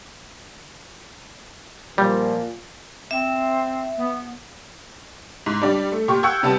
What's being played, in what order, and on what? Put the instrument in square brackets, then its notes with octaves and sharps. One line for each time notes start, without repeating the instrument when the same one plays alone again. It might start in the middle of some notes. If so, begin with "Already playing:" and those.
[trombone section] A#2 F3 [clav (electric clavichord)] G3
[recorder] C4 [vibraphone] E5
[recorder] B3
[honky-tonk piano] G#2
G3 D4 D5
A3
A#2 G4 C#6
F#5 G5 C#6 E6 G6 G#6
C3 G3 B3 A5